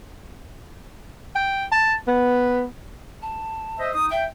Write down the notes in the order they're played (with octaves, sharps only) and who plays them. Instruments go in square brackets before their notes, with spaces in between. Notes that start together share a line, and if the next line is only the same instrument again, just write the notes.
[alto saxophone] G5
A5
B3
[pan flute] A5
[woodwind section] C5 D#5 E5
D#4 D#6
[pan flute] E5 [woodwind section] G5